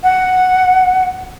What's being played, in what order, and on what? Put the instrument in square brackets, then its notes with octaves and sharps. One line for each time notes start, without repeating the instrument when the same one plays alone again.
[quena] F#5